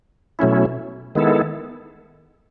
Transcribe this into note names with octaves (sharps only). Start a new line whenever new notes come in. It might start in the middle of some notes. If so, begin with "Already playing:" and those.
B2 F#3 A3 C#4 E4
D#3 G#3 B3 E4 A4